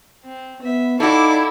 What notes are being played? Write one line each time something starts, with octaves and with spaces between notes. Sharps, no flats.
C4
B3 E5
D#4 E4 F#4 A4 D5 F5 D6